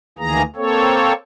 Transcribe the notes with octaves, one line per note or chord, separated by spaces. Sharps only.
D2 D#3 E3 A#3 G#4 A#5
A#3 C4 A4 C#5